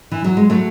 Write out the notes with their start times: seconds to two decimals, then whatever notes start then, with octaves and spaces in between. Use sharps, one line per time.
0.12 E3
0.24 F#3
0.37 G#3
0.50 F#3 A3